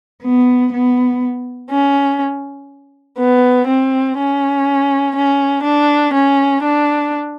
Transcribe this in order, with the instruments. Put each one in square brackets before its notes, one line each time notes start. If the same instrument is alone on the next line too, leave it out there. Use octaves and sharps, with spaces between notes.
[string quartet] B3
B3
C#4
B3
C4
C#4
C#4
D4
C#4
D4